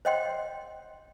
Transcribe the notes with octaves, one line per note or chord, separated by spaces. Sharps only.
C5 C#5 D#5 F#5 G5 C6